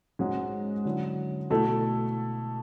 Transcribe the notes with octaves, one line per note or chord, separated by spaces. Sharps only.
G#2 G#3 C#4 F#4
D3 F#3 C#4 E4
B2 A3 E4 A4